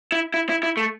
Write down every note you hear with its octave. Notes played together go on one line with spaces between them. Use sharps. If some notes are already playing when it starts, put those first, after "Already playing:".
E4
E4
E4
E4
A3